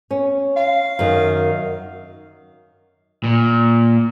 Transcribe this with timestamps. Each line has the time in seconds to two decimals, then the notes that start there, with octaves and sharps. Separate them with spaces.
0.11 C#4
0.57 F5
0.99 F#2 D#3
3.24 A#2